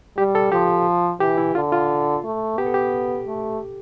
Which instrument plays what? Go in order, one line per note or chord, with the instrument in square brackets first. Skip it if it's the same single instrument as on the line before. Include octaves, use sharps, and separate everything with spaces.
[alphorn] G3 [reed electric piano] G4
[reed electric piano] A4
[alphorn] F3 [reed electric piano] G4
[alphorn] E3 [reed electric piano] G4
[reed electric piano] E4
[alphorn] D3 [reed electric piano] F4
[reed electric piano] F4
[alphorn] A3
[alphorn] B3 [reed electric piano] G4
[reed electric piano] A4
G4
[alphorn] A3